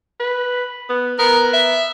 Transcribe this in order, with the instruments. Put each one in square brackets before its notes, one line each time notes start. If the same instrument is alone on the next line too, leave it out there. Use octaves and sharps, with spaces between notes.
[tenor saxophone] B4
B3
[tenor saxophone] B3 [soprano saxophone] A#4
[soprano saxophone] E5